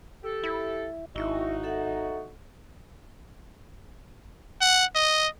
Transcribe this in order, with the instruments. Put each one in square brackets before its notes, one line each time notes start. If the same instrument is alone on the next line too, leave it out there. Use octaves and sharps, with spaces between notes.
[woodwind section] G4 A4
[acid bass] E4
[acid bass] G#1 [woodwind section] D#4 F#4 [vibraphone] E4 E5
[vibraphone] A4 E5 F#5
[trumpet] F#5
D#5